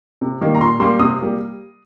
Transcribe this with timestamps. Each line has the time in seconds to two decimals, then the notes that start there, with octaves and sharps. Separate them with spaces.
0.21 C3
0.41 D#3 G3 A#3
0.55 A#5
0.61 A#2 C6
0.80 G3 A#3 C6
0.99 C3 D#6
1.19 G3 A#3